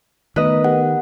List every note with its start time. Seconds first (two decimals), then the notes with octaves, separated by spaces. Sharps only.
0.36 D#3 A3 B3 A#4 B4 D#5
0.64 B3 G4 F#5